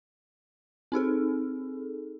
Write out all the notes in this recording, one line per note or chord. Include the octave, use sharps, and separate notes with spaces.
C4 D#4 G#4 A4